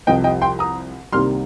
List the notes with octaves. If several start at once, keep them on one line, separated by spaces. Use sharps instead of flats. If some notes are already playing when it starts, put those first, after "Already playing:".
C2 C3 F3 D#5 G5
D#5 G5
G5 C6
A#5 D#6
C2 C3 D#3 G3 A#3 C6 F6